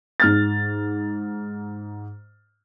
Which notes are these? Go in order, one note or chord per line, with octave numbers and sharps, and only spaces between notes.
G#2 F6 A6